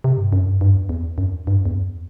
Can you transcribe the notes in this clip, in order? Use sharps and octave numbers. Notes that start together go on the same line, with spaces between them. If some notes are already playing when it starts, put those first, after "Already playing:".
C3
G2
F#2
G2
G2
E2
E2
F#2
G2
F#2
E2
F#2